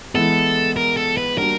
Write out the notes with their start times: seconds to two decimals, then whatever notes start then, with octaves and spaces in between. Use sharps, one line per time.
0.15 E3 G#3 B3 E4 A4
0.76 A#4
0.97 A4
1.17 B4
1.37 G3 A#3 D4 F#4 A#4